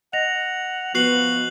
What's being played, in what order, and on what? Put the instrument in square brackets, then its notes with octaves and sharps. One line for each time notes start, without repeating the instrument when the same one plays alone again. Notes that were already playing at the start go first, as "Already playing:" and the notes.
[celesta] D#5 A#6 [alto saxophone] F#5 [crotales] F7
[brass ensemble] F3 B3 [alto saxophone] F#4 [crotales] F#6 C7 F#7